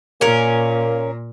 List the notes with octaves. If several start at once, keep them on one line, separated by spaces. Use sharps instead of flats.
A#2 A#3 C#4 A#4